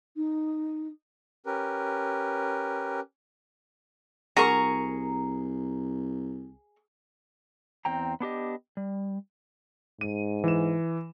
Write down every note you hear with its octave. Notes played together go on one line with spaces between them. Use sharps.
D#4
C#4 G4 A#4 B4
C2 F#4 G#4 A#4 A#5 C#6
E2 C4 G5 A#5
B3 D4 G4 D#5
G3
G#2 D#7
E3 E7